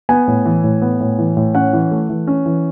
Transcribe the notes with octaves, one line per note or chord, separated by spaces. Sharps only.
B3 G#5
A2
E3
A2
B3
A2
E3
A2
C#4 F#5
E3
A3
E3
C#4
E3